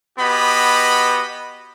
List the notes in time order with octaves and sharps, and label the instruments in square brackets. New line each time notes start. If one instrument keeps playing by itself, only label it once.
[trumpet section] B3 F#4 G4 D#5 B5